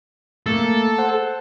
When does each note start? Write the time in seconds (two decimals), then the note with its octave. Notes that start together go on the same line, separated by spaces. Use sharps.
0.46 A3 A#3 A4
0.98 C5 F#5